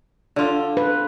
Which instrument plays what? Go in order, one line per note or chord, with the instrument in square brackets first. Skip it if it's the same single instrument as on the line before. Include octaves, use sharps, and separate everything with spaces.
[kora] D3 F4
[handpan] B4